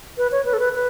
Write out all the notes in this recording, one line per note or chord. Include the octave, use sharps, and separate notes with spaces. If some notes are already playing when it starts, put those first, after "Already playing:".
B4
C#5
B4
A4
B4
B4